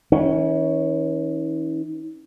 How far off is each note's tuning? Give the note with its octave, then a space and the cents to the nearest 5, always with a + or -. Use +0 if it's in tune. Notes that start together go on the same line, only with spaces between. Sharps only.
E3 -45 C#4 +0